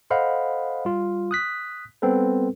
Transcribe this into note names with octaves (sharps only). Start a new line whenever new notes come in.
A4 C5 D#5 F5 F#5 B5
G3 F4
D#6 F#6 B6
G3 B3 C4 A4 B4